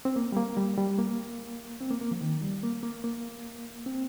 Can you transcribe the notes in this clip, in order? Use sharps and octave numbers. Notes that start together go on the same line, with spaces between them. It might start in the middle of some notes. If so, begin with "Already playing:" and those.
C4
A#3
G3
A#3
G3
G3
A#3
C4
A#3
A#3
F3
D#3
G3
A#3
A#3
A#3
C4